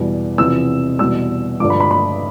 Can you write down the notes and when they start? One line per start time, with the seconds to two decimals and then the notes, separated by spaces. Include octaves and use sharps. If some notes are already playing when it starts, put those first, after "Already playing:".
Already playing: E2 B2 G3
0.38 E2 C3 F3 E6
0.99 E2 B2 G3 E6
1.60 G2 D3 F3 D6
1.70 B5
1.80 B5
1.91 B5